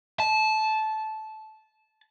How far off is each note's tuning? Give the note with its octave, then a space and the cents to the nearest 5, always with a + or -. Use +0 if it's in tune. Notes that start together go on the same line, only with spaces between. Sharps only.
A5 -15